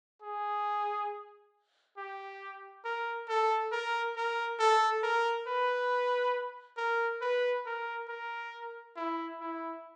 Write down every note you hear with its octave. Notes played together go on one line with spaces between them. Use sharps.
G#4
G4
A#4
A4
A#4
A#4
A4
A#4
B4
A#4
B4
A#4
A#4
E4
E4